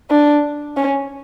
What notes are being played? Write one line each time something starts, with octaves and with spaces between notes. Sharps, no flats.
D4
C#4